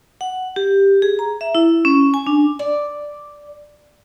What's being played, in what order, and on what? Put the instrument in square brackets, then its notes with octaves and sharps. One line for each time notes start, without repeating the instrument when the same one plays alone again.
[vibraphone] F#5
G4
G#4
A#5
E5
E4
C#4
G#5
D4
[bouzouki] D5